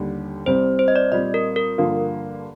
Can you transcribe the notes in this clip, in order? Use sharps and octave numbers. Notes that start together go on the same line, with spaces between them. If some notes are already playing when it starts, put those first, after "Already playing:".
Already playing: D#2 D3 G3
C2 C3 G3 C4 C5
C5
D#5
D5
A#2 G3 C4 D#5
A#4
A#4
G2 D3 F3 A#3 F4